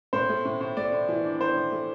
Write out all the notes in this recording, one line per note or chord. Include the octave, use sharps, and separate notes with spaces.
A2 C5
A3
A2
A2
A3 D5
A2
E3
D4
D4 C5
A2
A3